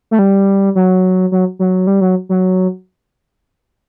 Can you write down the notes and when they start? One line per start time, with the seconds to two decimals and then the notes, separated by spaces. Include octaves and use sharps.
0.11 A3
0.19 G3
0.75 F#3
1.32 F#3
1.59 F#3
1.87 G3
2.01 F#3
2.29 F#3